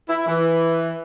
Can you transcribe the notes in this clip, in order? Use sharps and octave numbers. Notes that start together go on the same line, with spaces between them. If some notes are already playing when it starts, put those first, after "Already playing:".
E4
E3